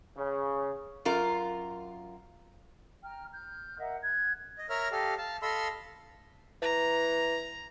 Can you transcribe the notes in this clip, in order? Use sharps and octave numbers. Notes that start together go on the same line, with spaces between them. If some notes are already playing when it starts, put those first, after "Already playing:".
C#3
F#2 F4 A#4
G5 A#5 F6
F6 G6
A#4 D#5 E5 F#5
F#6 G#6
D#5
A#4 C#5 E5 A#5 F6
G4 A4 D#5 F5
F5 A5
A4 D#5 F5 B5 C6 E6
E3 A#5